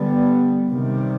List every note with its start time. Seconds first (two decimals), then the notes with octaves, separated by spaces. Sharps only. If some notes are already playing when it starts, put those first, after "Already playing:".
Already playing: D3 G3 B3
0.67 C3 D#3 G3